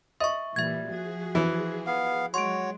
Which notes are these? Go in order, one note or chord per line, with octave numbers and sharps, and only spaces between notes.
D#5 E5 C#6
A#2 E3 G3 E5 G#6
F3 F#4 G#4
E3
B3 F5
F#3 G#3 F#4 C#5 C6 D7